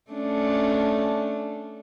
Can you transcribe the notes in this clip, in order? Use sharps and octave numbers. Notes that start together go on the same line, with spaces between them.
A3 C#4 D4